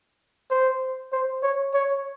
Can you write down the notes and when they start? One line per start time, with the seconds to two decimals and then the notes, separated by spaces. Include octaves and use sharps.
0.51 C5
1.12 C5
1.43 C#5
1.74 C#5